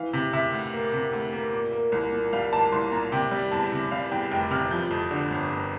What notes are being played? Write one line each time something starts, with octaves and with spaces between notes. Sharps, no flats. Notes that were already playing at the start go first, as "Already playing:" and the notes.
Already playing: E3 F5
C3
C3 E5
D2
A#3
C3
D2
A#3
A#2
A#3
C2
A#2
G3 F5
A#3 A5
C2 C6
A#2 A#5
C3 G5
G3
E2 A5
C3
G3 F5
E2 G5
F1 G5
C3 F6
F3 G6
F2
D3
G1
G1